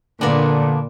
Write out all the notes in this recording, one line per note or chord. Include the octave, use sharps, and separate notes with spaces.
A#2 D3 A#3 B3 D4